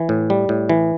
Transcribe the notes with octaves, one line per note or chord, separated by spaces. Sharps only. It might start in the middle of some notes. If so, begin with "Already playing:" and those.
Already playing: E3
A2
G3
A2
E3